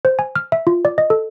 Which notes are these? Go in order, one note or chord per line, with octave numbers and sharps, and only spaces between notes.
C5
G#5
F6
E5
F4
D5
D#5
A4